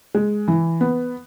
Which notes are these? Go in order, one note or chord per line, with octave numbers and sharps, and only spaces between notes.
G#3
E3
B3